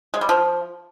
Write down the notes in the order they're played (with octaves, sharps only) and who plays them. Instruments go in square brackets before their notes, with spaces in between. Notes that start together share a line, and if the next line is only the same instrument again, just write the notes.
[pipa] G#3
G3
F3